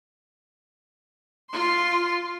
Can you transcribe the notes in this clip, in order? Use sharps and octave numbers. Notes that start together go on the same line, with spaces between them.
F4 C6